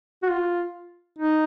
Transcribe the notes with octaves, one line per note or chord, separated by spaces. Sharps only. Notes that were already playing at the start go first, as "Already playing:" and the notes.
F#4
F4
D#4